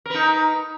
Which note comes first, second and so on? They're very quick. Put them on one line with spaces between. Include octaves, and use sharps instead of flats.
A#4 B4 D#4